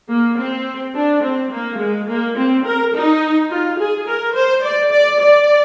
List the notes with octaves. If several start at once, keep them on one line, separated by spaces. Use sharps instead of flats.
A#3
C4
D4
C4
A#3
G#3
A#3
C4
A#4
D#4
F4
G#4
A#4
C5
D5
D5
D5